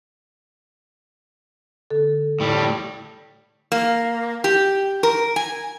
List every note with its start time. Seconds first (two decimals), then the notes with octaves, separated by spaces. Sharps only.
1.91 D3 A4
2.40 A2 G3
3.72 A#3
4.44 G4
5.03 A#4
5.36 G#5